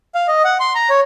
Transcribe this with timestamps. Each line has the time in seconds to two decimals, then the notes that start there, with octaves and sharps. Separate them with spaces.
0.15 F5
0.28 D#5
0.44 F#5
0.60 C6
0.75 A#5
0.90 C#5